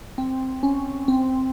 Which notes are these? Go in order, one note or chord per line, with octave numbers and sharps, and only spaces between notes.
C4
C#4
C4